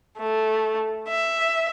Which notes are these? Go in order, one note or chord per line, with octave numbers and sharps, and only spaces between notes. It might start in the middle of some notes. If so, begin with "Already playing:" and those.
A3
E5